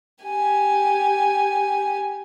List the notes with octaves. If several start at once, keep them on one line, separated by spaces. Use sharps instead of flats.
G4 G#5